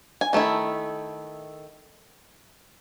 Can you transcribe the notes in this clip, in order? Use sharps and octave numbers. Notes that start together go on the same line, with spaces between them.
G#5
D#3 A3 E4